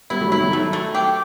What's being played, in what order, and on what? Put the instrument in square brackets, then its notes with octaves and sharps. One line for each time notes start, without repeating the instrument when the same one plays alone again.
[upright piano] G3 B3 [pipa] E4
[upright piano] F#3 A3
[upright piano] D#3 F#3 [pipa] E4
[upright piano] D#3 F#3
[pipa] A3
A3
G4